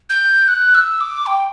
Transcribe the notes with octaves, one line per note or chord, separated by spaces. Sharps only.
G6
F#6
E6
D6
G5